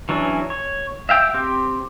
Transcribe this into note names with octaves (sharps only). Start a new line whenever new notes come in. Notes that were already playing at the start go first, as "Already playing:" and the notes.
E3 F#3 C#4 D4
C#5
E5 F5 G5 E6
C4 G4